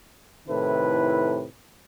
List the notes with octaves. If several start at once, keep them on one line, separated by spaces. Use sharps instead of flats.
A2 C3 D#3 E4 A4 B4